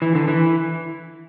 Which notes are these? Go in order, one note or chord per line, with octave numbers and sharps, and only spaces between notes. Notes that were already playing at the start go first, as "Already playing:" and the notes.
E3
D3
E3